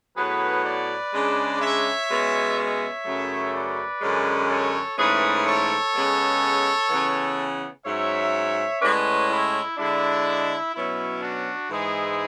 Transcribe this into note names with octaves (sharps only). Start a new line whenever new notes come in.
A2 F#3 B3 G#4 B4
B4 D5
C#3 G#3 D4
C#5 E5
B2 G#3 C#4
C#5 E5
F#2 C#3 F#3 A3
B4 D5
F#2 D3 G#3 C#4
A4 C#5
G#2 E3 A3 C#4 G#4 B4
A4 C#5
C#3 G#3 B3
C#3 E3 B3
G#2 F#3 C#4 C#5 E5
A2 G#3 C#4 B4 D5
E4
D3 G#3 D4 E4
B2 F#3 C#4 E4
D4 F#4
G#2 E3 G#3 E4 G#4